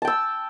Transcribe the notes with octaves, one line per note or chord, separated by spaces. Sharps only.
G5 A5 E6